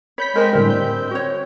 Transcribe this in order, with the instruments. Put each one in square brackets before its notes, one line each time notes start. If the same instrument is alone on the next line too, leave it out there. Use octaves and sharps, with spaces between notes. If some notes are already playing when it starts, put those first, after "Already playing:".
[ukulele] C#5 [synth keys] B5 G6 B6
[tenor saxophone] G#3 [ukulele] A#4 C5 G5
[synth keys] A2 D3 G3 [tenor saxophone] C4 [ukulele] A#4
[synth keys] G6
[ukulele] F#4 C#5